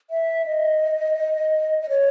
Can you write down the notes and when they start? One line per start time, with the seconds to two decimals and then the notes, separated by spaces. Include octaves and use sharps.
0.10 E5
0.46 D#5
1.82 D#5
1.89 C#5